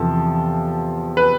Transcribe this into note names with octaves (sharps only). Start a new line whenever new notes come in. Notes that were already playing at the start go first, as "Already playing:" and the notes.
Already playing: E2 C3 F3 A4
B4